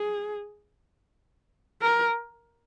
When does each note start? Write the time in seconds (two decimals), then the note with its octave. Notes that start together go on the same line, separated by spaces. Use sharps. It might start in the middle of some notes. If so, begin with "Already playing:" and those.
Already playing: G#4
1.82 A#4